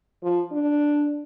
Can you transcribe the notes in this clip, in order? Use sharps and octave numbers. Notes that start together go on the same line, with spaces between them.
F3
D4